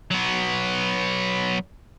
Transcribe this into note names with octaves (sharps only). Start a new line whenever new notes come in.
F#3 B3